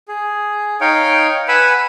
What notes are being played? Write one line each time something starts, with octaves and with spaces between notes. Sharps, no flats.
G#4
D#4 C#5 F5 G5
B4 F#5 G#5 B5 E6